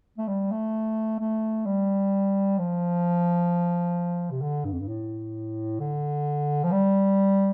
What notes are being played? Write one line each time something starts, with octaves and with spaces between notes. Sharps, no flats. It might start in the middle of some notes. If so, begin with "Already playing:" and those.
A3
G3
A3
A3
G3
F3
C3
D3
G2
F2
G2
A2
D3
F3
G3